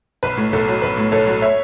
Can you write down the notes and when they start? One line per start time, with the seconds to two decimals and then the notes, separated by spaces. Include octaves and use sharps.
0.23 B1 B4
0.37 A2
0.53 B1 A4
0.68 F#3
0.82 B1 B4
0.97 A2
1.12 B1 A4 C#5
1.27 F#3
1.42 C#5 E5